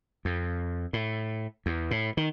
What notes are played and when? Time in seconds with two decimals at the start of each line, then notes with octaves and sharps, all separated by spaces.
0.25 F2
0.93 A2
1.66 E2
1.91 A2
2.17 D#3